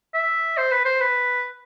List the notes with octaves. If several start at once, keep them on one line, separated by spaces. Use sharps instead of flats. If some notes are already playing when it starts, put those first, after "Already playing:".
E5
C5
B4
C5
B4